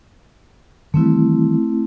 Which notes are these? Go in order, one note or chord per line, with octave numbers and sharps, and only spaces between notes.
D#3 E3 G3 A3 C4 E4